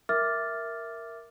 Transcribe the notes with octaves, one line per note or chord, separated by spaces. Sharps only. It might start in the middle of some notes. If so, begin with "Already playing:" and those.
A#4 E5 D6 F6 A6